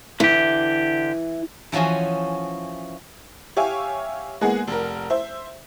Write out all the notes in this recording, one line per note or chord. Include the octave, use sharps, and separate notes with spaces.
D3 E3 G4
E3 F3 C#4 F#4 G#4
G4 C#5 E5 F5 G#5
G#3 A#3 B3 G#4 F#5
F1 A#4
C5 E5